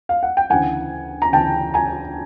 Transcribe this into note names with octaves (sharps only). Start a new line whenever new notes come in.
F5
F#5
G5
D2 C#3 E3 F#5 G#5
A#5
D2 C#3 E3 G5 A5
G#5 A#5